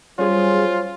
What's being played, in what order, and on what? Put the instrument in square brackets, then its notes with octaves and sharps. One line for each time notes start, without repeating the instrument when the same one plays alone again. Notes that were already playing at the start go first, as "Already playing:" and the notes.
[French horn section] F#3 C5 C#5 [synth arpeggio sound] G3 G#4 [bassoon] C#4 [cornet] F4